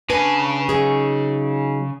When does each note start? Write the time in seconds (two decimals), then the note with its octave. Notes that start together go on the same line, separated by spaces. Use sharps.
0.10 C#3 D4 B4 G#5 A5
0.69 F#3 D#4 G#4